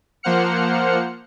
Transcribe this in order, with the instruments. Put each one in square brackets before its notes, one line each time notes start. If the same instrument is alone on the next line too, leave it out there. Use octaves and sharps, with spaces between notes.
[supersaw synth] F3 A#3 C5 F#5 F6 C#7